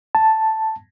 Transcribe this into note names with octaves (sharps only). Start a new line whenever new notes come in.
A5